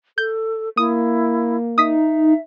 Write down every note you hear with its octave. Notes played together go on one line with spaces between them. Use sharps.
A4 G6
A#3 E4 D#6
D#4 E5 D#6 B6